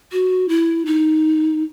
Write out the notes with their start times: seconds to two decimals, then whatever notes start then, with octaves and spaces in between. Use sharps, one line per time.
0.12 F#4
0.49 E4
0.86 D#4